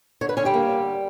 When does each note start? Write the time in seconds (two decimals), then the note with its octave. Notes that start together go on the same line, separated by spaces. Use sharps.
0.21 D3 C#5
0.29 B4
0.37 D3 C#4 C#5
0.45 G3 G4
0.54 A#3
0.70 D3